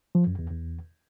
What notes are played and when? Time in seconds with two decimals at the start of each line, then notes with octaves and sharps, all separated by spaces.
0.15 F3
0.27 F#2
0.39 E2
0.51 E2